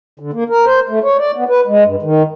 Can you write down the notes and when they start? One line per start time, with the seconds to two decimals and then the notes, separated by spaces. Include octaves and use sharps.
0.19 D3
0.33 A#3
0.49 A#4
0.66 C5
0.89 A3
1.03 C#5
1.18 D5
1.36 B3
1.49 B4
1.67 G#3
1.84 G2
2.03 D#3